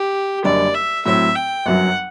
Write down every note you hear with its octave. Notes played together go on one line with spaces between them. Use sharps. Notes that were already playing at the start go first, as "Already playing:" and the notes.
Already playing: G4
F#1 F#2 D3 G3 D5
E5
A2 F#3 C4 E5
G5
G1 F#2 F#3 F#5